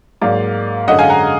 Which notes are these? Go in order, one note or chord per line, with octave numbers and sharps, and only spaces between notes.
G#2 F#3 A#3 D5 F5
F#2 D3 G#3 D#5 F#5
F5 G#5
F#5 A#5